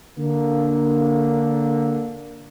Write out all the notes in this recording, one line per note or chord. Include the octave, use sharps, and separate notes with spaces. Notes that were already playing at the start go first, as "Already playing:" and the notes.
D3 A#3